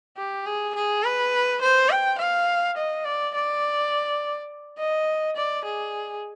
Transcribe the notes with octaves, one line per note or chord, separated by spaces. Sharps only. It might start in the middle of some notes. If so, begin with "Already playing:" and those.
G4
G#4
G#4
B4
C5
G5
F5
D#5
D5
D5
D#5
D5
G#4